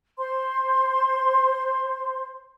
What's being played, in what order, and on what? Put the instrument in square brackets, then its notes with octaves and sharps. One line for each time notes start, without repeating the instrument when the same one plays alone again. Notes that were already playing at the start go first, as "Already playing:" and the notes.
[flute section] C5 C6